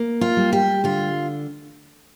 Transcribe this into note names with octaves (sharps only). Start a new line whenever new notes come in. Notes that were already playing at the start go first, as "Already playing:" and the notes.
Already playing: A#3
F4
G3
G4
D3 F4